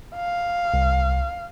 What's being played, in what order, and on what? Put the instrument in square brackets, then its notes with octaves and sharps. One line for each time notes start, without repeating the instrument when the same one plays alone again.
[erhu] F5
[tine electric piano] C2